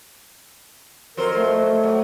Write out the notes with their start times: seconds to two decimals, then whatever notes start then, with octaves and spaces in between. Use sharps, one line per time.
1.17 F2 F#3 A#4 C5
1.37 A3
1.55 A3
1.83 F#3